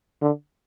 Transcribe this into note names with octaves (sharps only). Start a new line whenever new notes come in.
D3